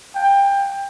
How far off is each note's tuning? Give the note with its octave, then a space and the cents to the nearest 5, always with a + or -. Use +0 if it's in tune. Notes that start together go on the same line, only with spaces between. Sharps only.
G5 +20